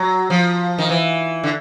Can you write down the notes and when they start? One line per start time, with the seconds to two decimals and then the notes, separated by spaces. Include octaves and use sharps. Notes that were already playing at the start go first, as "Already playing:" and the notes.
Already playing: F#3
0.30 F3
0.78 D#3
0.89 E3
1.44 D3